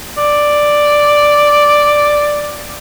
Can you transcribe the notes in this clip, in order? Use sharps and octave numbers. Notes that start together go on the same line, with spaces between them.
D5